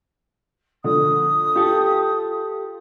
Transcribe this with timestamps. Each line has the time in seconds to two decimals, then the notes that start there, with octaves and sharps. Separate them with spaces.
0.84 D3 F3 D#6
1.56 F4 G4 A4